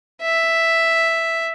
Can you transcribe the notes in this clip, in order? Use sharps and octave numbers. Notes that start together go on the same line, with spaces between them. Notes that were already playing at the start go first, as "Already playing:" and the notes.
E5